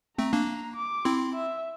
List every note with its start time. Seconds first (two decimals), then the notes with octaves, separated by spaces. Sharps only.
0.18 A3 C4 A#5
0.33 A#3 D4
0.76 D6
1.05 C4 E4 C6
1.35 E5